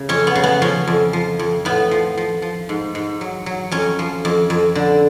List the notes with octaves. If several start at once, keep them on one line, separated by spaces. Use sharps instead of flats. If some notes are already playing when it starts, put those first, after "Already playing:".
Already playing: C#3
F2 C#4
B3
C#3
B3
F3 C#4
F2
F3
F2
A2 B3
F3
F3
F3
G#2
G#2
F#3
F#3
F2 C#4
F3
F2
F2
D3